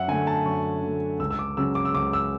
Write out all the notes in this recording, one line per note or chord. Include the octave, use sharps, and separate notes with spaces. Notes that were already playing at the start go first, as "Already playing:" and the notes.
Already playing: F#2 E5 F#5
D3 A3 G#5
A5
F#2 C#6
D3 A3
C#2 E6
E6
D6
C#3 F#3 C#4 E6
D6
E6
C#2 D6
E6